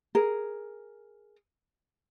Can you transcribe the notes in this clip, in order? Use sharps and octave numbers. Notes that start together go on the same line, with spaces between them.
G#4 A#4